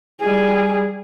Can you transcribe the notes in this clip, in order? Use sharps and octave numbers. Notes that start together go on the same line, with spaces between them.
G3 G#4